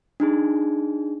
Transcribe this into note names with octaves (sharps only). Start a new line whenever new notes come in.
D4 D#4 G#4